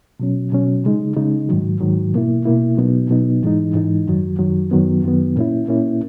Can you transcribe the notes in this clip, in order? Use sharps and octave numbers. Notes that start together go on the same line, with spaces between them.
B2 F#3 C#4
B2 F#3 C#4
C#3 G#3 D#4
C#3 G#3 D#4
G#2 D#3 F#3
G#2 D#3 F#3
B2 A#3 E4
B2 A#3 E4
B2 F#3 B3 D#4
B2 F#3 B3 D#4
G#2 E3 G#3 D#4
G#2 E3 G#3 D#4
F#2 D#3 F#3
F#2 D#3 F#3
F#2 D#3 F#3 B3
F#2 D#3 F#3 B3
A#2 A#3 C#4 E4
A#2 A#3 C#4 E4